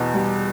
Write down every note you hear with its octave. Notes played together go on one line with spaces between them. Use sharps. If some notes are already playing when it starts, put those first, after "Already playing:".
Already playing: E2 B2
G3